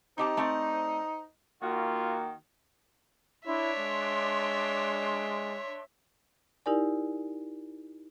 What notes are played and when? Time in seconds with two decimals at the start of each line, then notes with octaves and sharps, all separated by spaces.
0.18 C4 D#4 G4 C5 A5
0.37 A3 C4 D5
1.62 D#3 A#3 F4 F#4
3.47 D4 E4 C#5 E5 C6
3.79 G#3
6.66 D#4 E4 G4 A#4 D5 G#5